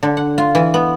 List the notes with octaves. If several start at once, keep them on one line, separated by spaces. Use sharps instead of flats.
D3
F#5
F4
E3
B3